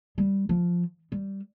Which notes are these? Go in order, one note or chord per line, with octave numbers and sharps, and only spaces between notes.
G3
F3
G3